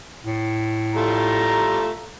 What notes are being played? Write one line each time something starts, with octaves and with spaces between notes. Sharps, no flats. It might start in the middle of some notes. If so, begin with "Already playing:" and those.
A2
G3 A3 F4 A#5